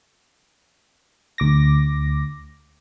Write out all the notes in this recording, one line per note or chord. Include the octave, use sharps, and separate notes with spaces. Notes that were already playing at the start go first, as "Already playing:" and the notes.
D2 D6 A#6